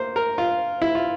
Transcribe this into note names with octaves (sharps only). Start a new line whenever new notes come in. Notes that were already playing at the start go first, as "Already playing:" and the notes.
Already playing: A#3 C5
A#4
F4
E4
F4